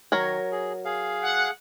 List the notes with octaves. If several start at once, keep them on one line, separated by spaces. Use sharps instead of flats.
D#3 F#3 A#4 C#5
G#4
G#4 F5
F#5